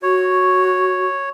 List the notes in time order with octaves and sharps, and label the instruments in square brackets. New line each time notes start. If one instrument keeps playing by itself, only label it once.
[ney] F#4 [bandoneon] C#5